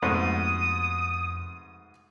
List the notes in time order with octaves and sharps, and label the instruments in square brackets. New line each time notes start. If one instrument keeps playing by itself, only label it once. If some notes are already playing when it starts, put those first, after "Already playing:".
[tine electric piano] F2 [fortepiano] G#2 B2 A3 [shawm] D#6